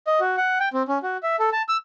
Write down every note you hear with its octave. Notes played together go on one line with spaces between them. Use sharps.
D#5
F#4
F#5
G5
C4
C#4
F#4
E5
A4
A5
E6